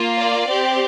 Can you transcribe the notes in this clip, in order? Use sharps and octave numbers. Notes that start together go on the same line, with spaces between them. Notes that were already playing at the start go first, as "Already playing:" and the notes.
Already playing: A#3 F4
D5
C4 G4